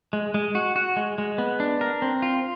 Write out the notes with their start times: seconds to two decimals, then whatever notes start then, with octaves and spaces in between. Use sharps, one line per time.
0.13 G#3
0.34 G#3
0.55 F#4
0.76 F#4
0.96 G#3
1.18 G#3
1.38 B3
1.60 D4
1.81 A#4
2.02 C4
2.22 F4